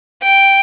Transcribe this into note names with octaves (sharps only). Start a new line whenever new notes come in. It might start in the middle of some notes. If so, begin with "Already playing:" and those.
G5